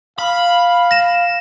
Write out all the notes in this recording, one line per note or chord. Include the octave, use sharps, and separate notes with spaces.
F5 B5
A#6 E7